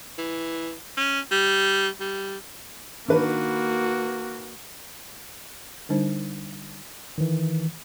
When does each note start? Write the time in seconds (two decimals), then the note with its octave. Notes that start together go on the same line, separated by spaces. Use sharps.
0.18 E3
0.97 C#4
1.31 G3
2.00 G3
3.08 D#3 A#3 D4 F#4 B4
5.89 D3 G3 D4 D#4 C5
7.18 D#3 E3